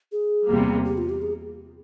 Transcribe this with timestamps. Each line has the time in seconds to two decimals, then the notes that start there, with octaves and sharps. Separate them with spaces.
0.12 G#4
0.48 E2 C3 G3 A#3
0.85 G4
0.98 F4
1.09 G4
1.22 G#4